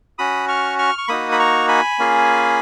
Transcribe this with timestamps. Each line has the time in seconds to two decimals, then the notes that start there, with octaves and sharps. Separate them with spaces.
0.18 C#4 F#4 B5 D#6
0.48 C#6 F6
0.79 C#6 F6
0.98 C#6
1.08 A#3 D#4 F#4 B5 D#6
1.32 B5
1.39 A#5 C#6
1.68 G#5 B5
1.99 A#3 C#4 F4 G#4